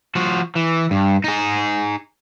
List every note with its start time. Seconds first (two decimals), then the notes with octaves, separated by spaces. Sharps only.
0.15 F3 F#4
0.56 E3
0.91 G2
1.24 D#4 G#4